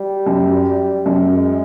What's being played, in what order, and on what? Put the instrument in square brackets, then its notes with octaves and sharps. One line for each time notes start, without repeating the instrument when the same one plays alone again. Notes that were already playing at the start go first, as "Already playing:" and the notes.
Already playing: [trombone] G3
[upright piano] F#2
F#2
[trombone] G#3